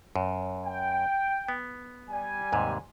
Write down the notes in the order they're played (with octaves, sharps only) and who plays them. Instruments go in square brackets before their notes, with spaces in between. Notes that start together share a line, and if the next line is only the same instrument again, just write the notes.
[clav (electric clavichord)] F#2
[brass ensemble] G5
[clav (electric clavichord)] B3
[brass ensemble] G3 G#5
[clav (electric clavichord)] D#2 G#2 C3